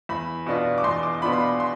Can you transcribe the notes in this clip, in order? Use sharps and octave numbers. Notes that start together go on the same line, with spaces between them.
E2 B5
B2 B3 D4 F4
D6
E2 C6
D6
B2 B3 D4 F4 B5
C6
B5
C6